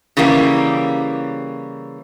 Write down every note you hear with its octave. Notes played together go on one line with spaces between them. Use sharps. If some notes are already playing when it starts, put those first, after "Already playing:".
C#3 E3 G3 A#3 G4